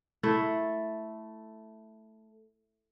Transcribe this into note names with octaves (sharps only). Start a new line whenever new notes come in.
A3 E4